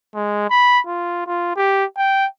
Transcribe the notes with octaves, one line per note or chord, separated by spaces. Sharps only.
G#3
B5
F4
F4
G4
G5